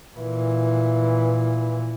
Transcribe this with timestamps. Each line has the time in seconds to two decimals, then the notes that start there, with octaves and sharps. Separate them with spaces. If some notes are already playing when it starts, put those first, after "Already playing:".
0.17 A#2 E3